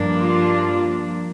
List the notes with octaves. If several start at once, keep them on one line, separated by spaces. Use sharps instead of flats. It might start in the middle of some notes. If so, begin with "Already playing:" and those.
Already playing: G2 F3 A#3 D4
F4